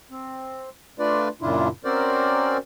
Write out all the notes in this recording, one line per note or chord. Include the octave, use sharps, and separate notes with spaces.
C4
A3 D4 F4 B4 D5
F#2 A#2 C#3 D4 E4 F4
C4 C#4 F#4 A#4 C5 D5